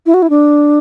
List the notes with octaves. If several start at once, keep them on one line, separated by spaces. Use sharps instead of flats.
E4
F#4
E4
D4